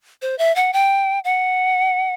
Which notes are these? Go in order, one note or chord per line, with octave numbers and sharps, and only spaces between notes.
C5
E5
F#5
G5
F#5